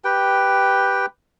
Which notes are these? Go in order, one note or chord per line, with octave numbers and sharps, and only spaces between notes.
G4 B4 G5